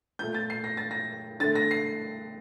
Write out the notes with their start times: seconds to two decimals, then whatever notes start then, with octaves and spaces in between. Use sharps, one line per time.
0.19 A#2 A3 G6
0.34 A6
0.50 C7
0.64 A#6
0.77 A6
0.91 A#6
1.40 D3 A6
1.43 A3
1.56 A#6
1.71 C7